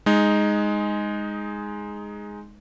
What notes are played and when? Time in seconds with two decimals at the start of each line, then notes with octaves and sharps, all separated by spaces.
0.06 G#3 D#4